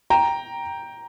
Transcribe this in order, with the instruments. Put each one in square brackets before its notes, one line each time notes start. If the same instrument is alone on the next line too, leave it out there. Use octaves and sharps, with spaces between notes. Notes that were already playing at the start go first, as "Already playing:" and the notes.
[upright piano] G5 A#5